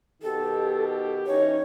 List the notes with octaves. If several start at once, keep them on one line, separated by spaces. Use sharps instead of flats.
B2 D#3 G4 A4
E3 C#4 D#4 C#5